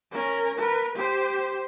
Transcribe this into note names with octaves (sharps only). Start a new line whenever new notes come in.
C#4 A#4
A#4 B4
G4 C5